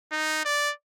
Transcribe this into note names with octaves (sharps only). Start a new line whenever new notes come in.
D#4
D5